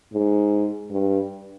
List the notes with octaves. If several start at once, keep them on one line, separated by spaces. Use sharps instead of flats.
G#2
G2